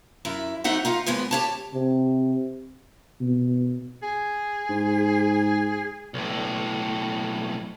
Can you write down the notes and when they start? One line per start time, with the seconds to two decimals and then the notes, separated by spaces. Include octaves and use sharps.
0.25 F#2 E4 E5
0.64 F#3 A3 C4 D#4 E5 F#5
0.85 D#4 F4 F5
1.06 D#2 G#2 G#3 B3
1.31 G4 C#5 A5
1.74 C3
3.20 B2
4.03 G#4
4.69 G#2
6.14 B1 A2